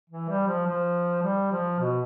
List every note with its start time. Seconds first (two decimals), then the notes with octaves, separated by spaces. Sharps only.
0.10 E3
0.29 G3
0.47 F3
0.67 F3
1.23 G3
1.52 F3
1.80 B2